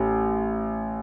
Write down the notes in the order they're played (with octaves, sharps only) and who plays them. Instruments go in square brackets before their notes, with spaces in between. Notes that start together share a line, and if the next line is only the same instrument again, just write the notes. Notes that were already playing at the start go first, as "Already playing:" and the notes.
Already playing: [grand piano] A1